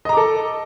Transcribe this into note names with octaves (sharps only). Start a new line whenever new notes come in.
A4 D#5 A#5 D6